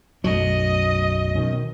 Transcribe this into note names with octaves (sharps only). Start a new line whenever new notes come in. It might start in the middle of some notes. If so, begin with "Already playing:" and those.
B1 F#2 F#3 A3 D#5
B2 D#3 C#4